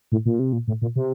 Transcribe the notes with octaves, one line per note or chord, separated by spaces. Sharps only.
A2
A#2
C3
A#2
A2
A#2
C3